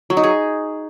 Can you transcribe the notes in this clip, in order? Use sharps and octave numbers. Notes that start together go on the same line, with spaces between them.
F#3
D#4
G#4